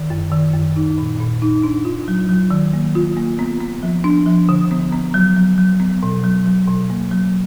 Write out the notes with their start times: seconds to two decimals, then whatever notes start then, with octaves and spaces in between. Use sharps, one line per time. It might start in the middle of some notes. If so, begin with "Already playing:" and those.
Already playing: D#3
0.10 F#2
0.32 D#3
0.54 F#2
0.76 D#4
0.98 A#2
1.20 A#2
1.42 D#4
1.63 D4
1.85 F4
2.08 F#3
2.29 F#3
2.51 D#3
2.73 A#3
2.95 F4
3.17 A#3
3.39 B3
3.60 B3
3.83 F3
4.04 D4
4.26 F3
4.49 D3
4.71 B3
4.92 B3
5.14 F#3
5.36 F#3
5.58 F#3
5.80 B3
6.03 B2
6.24 F#3
6.46 F#3
6.67 B2
6.90 A#3
7.11 F#3